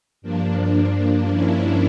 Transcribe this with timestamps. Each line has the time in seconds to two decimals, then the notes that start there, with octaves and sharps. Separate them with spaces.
0.22 G2 F3 A#3 D4
0.59 D4
1.31 C#4 E4